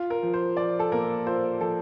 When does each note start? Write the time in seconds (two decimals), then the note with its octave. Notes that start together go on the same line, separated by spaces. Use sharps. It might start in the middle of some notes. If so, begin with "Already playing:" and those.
Already playing: F4
0.10 A#4
0.23 F3
0.34 C5
0.57 F3 D5
0.79 A4
0.92 A#3 A#4
1.26 F4 C5
1.60 F3 A4